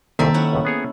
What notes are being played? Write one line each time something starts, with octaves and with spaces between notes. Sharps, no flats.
C2 A#2 D#3 A#3 C4 A4 E5 A#5
F#3 C#4 E4 F#5
C#2 A2
B3 G#4 C#5